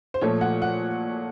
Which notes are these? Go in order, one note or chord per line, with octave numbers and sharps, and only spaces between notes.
C5
A#2 F3 A3 C#5
F#5
F#5